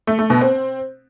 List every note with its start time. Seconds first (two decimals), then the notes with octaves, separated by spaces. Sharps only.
0.07 A3
0.19 A3
0.30 B2
0.41 C4